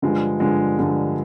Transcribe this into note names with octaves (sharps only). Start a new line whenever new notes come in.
G2 D3 F3 G#3
G2 D3 F3 G#3
G2 D3 F3 G#3